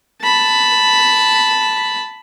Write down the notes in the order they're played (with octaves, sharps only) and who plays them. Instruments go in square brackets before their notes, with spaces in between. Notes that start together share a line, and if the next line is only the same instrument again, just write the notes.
[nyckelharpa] A5 B5